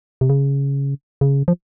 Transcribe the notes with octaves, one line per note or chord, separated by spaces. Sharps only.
C3
C#3
C#3
F3